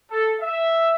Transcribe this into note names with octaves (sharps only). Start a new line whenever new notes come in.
A4
E5